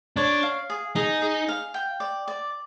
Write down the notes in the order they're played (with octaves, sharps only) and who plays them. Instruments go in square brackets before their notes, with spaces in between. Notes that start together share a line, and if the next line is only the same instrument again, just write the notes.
[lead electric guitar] D4 [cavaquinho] C#5
[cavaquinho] F5
G#4
[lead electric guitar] D#4 [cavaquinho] G#4
[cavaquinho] G#4
F5
G5
D5
D5